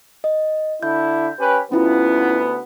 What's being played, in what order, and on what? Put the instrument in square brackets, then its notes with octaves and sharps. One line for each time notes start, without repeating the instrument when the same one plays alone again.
[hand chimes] D#5
[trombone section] D3 E4 [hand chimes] G6
[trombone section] C#4 G4 B4
[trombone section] D2 B3 [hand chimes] C#4 E4 F4